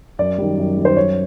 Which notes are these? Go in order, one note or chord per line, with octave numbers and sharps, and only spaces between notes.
F#2 D5
D#3 G3
F#2
D#3 G3
C5
F#2 C#5